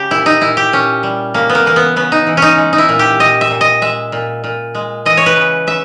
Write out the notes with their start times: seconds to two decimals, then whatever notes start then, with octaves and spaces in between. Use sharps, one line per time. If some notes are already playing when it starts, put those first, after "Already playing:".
Already playing: C#3 G4
0.11 A#2 E4
0.26 D#4
0.41 A#2 E4
0.57 G4
0.73 A#2 C#4
1.03 G3
1.34 C#3 A#3
1.50 B3
1.55 A#3
1.66 E3 A#3
1.76 B3
1.96 C#3 B3
2.12 D#4
2.27 E3
2.37 C#4 D#4
2.58 G#3
2.73 D#4
2.78 E4
2.89 A#2
2.99 G4
3.20 A#2 D#5
3.41 E5
3.51 A#2
3.61 D#5
3.82 G#3 E5
4.12 A#2
4.44 A#2
4.75 G#3
5.06 E3 D#5
5.17 C#5
5.26 B4
5.36 C#3
5.67 C#3 E5